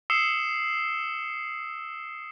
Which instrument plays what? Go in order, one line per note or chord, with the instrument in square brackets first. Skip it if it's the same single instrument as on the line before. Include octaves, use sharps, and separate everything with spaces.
[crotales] D#6 E6 C7 C#7 E7 G7